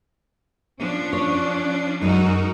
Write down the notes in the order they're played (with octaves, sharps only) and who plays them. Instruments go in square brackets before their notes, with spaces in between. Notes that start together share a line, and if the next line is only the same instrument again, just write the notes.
[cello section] F3 C#4 D4
[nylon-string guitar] C#5
[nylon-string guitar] F#2 G#3 [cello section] D#4 F#4 A#4